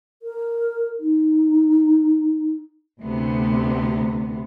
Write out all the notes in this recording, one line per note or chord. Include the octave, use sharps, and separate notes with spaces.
A#4
D#4
D2 C3 B3